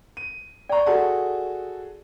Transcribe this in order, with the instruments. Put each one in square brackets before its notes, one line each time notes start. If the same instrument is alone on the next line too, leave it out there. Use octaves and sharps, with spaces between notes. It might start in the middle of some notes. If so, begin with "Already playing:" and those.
[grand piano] D#7
[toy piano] D5 C#6 [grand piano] G5 A#5
[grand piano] F#4 G#4 A4 [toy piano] A5 C6